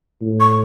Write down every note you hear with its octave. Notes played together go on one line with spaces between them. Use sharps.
A2
C#6